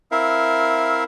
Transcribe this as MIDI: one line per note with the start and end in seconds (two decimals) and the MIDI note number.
0.11 1.04 60
0.11 1.04 64
0.11 1.04 70
0.11 1.04 76
0.11 1.04 77